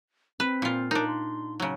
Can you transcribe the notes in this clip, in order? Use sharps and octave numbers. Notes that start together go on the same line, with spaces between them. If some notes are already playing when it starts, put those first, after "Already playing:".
C4 B4
A#2 F4
D4 D#4 A#4
C6
C#3 F#3